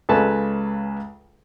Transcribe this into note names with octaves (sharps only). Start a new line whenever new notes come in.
C#2 C#3 G#3 A4 B4 A5